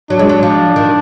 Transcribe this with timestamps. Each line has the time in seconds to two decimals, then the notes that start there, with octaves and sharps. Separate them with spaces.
0.10 F#3 D4
0.19 G#3
0.29 F#3
0.43 F3
0.76 D#3